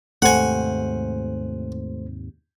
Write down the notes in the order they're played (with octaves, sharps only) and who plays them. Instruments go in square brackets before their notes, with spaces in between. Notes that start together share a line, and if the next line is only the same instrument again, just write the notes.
[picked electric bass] D#2 G#2 C3 [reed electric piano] A3 C5 [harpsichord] F#5 G#5